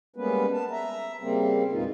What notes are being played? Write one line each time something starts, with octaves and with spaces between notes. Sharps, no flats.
G3 G#3 A#3 B3 C#4 B4
A5
E5 A#5
C#3 G3 A#3 C4
F2 B2 E3 G#3 D#4 F4